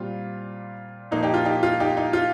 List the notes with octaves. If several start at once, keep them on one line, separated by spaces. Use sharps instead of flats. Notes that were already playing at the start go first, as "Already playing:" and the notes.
Already playing: A#2 G3 C4 F4
A#2 F3 A#3 D#4
D#4 G4
F4
D#4 G4
F4
D#4 G4
D#4
F4